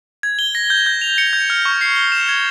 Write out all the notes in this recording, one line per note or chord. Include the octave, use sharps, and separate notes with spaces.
G#6
G7
A#6
G6
G6
F7
C#7
G6
F6
C#6
C7
G7
E7
G#6